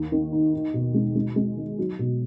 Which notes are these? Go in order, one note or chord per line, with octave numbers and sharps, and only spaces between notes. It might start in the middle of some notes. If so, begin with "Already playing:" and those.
Already playing: D#2
D#3
D#4
D#4
B2
G#3
G#3
G#3
D#3
F#3
B2